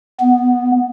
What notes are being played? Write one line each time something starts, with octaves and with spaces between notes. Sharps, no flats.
B3